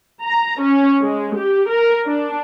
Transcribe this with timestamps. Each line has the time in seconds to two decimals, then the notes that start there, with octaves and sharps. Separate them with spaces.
0.23 A#5
0.62 C#4
1.02 G#3
1.36 G4
1.70 A#4
2.06 D4